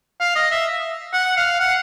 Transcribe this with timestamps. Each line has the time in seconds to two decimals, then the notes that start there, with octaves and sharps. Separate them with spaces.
0.20 F5
0.36 D#5
0.51 E5
1.13 F#5
1.37 F5
1.60 F#5